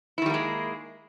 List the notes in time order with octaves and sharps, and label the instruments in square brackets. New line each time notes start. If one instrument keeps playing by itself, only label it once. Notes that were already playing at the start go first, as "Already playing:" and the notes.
[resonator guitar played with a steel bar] E4
D#3
G3
A#3
G#3